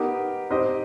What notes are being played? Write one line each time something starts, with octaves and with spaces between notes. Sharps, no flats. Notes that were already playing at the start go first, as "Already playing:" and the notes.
Already playing: B3 D#4 G4 A#4 D#5
C4 D#4 G4 C5 D#5